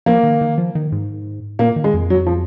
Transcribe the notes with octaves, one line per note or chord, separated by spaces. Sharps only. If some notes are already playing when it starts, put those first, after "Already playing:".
F3 A#3
D#3
D#3
F3
D#3
G#2
A#2 A#3
D#3
G#3
F2
F#3
F3